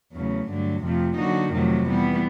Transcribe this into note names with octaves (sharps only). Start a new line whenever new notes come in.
E2 C#3 F#3 A3
G2 D3 F#3 A3
F2 C3 F3 A3
D3 F#3 A#3 D#4 F#4
F2 C3 D#3 F#3 A3
E3 G3 B3